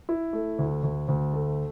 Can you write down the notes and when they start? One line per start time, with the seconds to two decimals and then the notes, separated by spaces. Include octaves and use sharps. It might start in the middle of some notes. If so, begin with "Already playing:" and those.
0.09 E4
0.33 A3
0.59 D2
0.83 D2
1.08 D2
1.34 A3